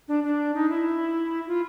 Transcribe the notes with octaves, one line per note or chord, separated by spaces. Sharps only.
D4
D4
D#4
E4
F4